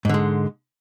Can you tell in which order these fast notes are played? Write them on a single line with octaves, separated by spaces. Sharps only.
G#2 D3 G#3